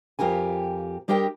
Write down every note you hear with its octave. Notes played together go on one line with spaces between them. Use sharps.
F2 F4 G4 A#4 G#5
G3 D4 G4 A#4 D#5 G5